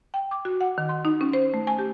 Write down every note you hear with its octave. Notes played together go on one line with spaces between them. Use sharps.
G5
D6
F#4
F#5
D#3
C6
D#4
C#4
C5
A3
G#5
G4